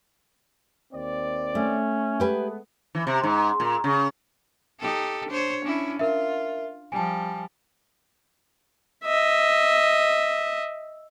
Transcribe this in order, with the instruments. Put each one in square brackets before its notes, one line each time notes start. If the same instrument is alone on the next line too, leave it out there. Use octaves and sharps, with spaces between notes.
[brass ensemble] D#2 C4 D5
[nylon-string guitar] A3 [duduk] C#4
[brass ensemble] G#3 A3 B3 [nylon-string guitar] G4 B4 G#5
[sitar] E3
C3
G#2
A#2
C#3
[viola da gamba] D#4 G4 A4
D4 C5 C#5
C#4 D4 E4
[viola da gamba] F4 [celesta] A#4 E5
[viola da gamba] F3 G3 [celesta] G#5 A5
[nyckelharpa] D#5 E5